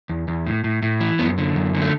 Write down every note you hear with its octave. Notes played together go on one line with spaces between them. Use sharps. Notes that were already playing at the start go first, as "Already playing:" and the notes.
E2
E2
A2
A2
A2
E3
F#2 B3
D3
F#2
D3
A3